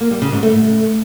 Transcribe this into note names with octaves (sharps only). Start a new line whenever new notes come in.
A#3
G3
C#3
G#2
A3